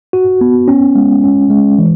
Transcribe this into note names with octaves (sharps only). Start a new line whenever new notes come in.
F#4
B3
C#4
G#3
C#4
G#3
E3